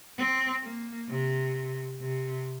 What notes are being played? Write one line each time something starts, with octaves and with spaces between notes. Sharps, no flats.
C4
A#3
C3
C3